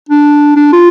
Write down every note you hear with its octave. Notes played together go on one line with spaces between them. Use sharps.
D4
D4
F4